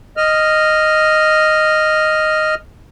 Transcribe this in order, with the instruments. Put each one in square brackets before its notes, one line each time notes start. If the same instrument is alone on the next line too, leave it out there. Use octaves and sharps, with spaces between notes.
[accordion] D#5 F6